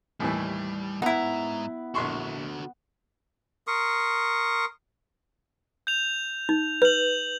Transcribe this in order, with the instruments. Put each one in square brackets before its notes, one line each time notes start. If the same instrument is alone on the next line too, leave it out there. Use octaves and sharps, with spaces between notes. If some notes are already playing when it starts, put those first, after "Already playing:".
[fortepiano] D#2 A2 E3 [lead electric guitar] G3
[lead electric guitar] G#2 A#5 [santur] B3 [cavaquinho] D#4 E4
[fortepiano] A#1 C6 C#6 [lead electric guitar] D3 F#4
[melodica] A#4 C6 C#6 D#6
[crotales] G6 F7
[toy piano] D#4
[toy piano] B4 [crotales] G6 F#7